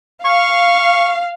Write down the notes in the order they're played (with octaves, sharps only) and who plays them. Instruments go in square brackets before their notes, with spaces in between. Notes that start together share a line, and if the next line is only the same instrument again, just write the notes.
[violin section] F5 [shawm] C#6